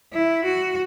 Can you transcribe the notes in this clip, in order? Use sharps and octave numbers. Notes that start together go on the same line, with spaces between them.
E4
F#4